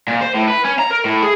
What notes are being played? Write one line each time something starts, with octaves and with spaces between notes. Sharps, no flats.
A#2
C5
A2
B4
C#4
A#5
A#4
A2
G#4